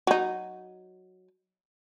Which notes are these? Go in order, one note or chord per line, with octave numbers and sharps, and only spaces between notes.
F#3 D#4